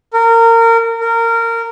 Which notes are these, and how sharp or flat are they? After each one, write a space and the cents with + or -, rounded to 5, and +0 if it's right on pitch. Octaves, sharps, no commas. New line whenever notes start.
A#4 -25
A#4 -20